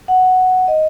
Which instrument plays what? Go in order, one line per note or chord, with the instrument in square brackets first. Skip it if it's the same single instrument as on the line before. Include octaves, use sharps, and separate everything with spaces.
[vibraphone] F#5
D#5